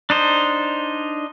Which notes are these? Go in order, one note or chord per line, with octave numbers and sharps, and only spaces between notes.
D4 D#4 C5